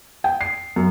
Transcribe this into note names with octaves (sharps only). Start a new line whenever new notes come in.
G5
C7
F#2